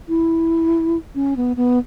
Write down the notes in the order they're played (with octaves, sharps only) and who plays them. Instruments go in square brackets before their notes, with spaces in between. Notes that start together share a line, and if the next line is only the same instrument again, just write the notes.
[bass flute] E4
C#4
B3
B3